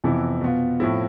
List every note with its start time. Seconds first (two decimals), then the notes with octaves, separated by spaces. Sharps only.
0.04 F2 C3 E3 B3 E4
0.41 B2 B3 F4
0.80 A2 F3 C4 E4